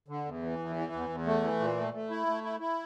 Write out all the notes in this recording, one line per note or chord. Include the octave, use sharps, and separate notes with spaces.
D3
E2
E3
E2
E3
E2
E2
A3
E3
A#2
A3
A3
E4
A3
E4
E4